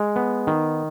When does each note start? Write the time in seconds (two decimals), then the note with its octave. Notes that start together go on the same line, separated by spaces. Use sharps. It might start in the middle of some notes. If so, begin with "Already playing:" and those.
Already playing: G#3
0.16 B3
0.47 D#3